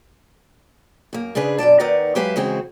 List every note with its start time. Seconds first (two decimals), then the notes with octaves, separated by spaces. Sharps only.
1.13 F#2 A#3
1.35 G#2 C#3 D4 G#4 B4
1.58 F#2 B2 D5 A5
1.80 D#2 D#4 A#4 B4 D5 F#5
2.15 F#3 G#3 G4 B4 E5 F5
2.36 C#3 E3 G#3 C4 F#4